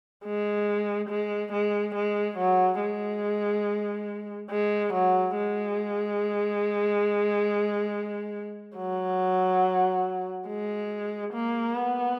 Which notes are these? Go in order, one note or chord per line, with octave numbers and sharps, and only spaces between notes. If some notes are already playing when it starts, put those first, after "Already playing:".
G#3
G#3
G#3
G#3
F#3
G#3
G#3
F#3
G#3
F#3
G#3
A#3
B3